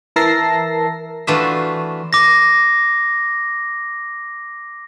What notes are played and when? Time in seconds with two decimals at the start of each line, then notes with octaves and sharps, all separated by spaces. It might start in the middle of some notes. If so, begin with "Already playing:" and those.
0.16 E3 A#4 E5 A5 A#6 C7
1.27 E3 A3 D4 F4 F#4 E5
2.13 D6 A#6